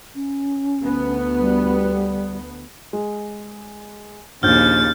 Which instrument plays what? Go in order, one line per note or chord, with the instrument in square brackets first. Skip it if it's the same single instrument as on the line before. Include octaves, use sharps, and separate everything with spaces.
[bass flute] C#4
[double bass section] D2 B3
[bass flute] G3
[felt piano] G#3
[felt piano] A#1 [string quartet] D#2 C#3 A6 [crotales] F6 G6